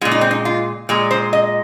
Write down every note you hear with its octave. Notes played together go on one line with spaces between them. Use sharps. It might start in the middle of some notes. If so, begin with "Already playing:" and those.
A#2 G#3 F4
D#4
C4
D#4
F4
A#2 G#3
C5
D#5